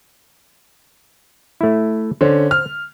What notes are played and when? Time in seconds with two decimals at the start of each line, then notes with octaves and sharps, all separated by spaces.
1.61 A3 E4
2.21 D3 C#4 C5
2.51 F6